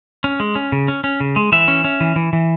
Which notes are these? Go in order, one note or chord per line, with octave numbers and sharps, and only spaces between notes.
C#4
G#3
C#4
C#3
C#4
C#4
C#3
G#3
E3 E5
C#4
C#4
E3
E3
E3